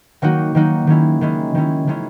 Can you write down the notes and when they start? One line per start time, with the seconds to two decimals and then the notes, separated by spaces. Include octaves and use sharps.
0.22 D#3 F#3 A#3 D#4 F#4
0.55 D#3 F#3 A#3 D#4 F#4
0.87 D#3 G#3 C#4 E4
1.21 D#3 G#3 C#4 E4
1.55 D#3 G#3 C#4 E4
1.87 D#3 G#3 C#4 E4